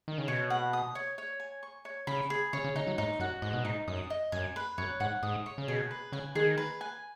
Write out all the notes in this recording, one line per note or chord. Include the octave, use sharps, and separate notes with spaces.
D#3
C#3
B2 C#5
F#5
D#6
C#5
C#5
G#5
C#6
C#5
C#3 B5
G#4
C#3 C#5
C#3
C#3 D#4
F#3
G#2 D#4
F#2 F#4
G#2 D#5
B2
G#2 D#4
F#2 D#6
D#5
F#2 G#5
B4
F#2 C#5
G#2 F#5
G#2 D#6
C#5
C#3
B2 G#4
B4
C#3 G#5
D#3 G#4
B4
G#5